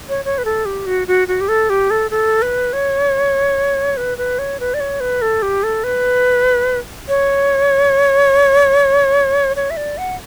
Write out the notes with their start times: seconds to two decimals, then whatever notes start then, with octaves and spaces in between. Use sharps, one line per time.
0.09 C#5
0.25 C#5
0.38 B4
0.45 A4
0.65 G4
0.86 F#4
1.07 F#4
1.28 F#4
1.41 G4
1.48 A4
1.70 G4
1.91 A4
2.11 A4
2.42 B4
2.73 C#5
3.97 B4
4.18 B4
4.39 C#5
4.60 B4
4.74 D5
4.80 C#5
5.00 B4
5.22 A4
5.42 G4
5.63 A4
5.84 B4
7.08 C#5
9.56 C#5
9.70 E5
9.77 D5
9.98 F#5